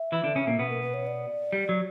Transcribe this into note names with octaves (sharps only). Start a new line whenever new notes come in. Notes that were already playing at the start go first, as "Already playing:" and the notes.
Already playing: E5
E3 E4
D3 D4
C#3 C#4
A#2 A#3
B2 B3
A#4
B4
C#5
D5
G3
F#3